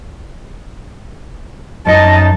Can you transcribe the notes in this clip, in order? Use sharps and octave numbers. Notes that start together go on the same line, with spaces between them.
F#2 D#4 D#5 A5